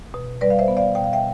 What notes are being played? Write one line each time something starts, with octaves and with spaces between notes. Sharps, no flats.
B2
G3 B4 D5
F5
C5 E5
B3
D5 F5
B2 G5
F5
E5 G5